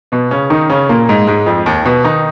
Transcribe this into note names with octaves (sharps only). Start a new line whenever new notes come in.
B2 B3
C#3 C#4
D#3 D#4
C#3 C#4
A#2 A#3
G#2 G#3
G#2 G#3
F2 F3
D#2 D#3
B2 B3
D#3 D#4